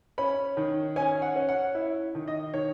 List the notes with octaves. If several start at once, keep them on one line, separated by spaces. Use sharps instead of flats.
C#4 B5
D#3
C#4 G#5
F#5
C#4
F#5
E4
D#3
D#5
D#3 C#5